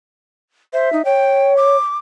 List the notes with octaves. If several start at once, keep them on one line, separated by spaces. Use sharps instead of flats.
C5 E5
D#4
C#5 G5
D6